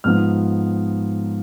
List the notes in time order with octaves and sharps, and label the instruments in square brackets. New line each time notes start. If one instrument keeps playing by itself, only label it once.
[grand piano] G#2 F3 B3 D#4 F6